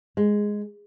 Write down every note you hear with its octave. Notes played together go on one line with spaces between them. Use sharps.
G#3